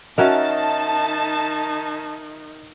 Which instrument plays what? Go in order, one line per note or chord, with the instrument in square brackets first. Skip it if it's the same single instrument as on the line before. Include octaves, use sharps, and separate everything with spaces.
[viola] D#3 D#4 [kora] C#4 F#4 A#4 [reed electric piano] D#5 E5 [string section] A5